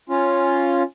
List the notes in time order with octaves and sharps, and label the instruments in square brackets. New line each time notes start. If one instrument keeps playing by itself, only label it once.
[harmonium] C#4 F4